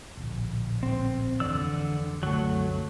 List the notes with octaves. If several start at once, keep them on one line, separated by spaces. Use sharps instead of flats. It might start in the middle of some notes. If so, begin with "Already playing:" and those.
D1 A#1
C4
F1 B1 D3 E3 D5 E6
C2 F#2 D3 F#3 A3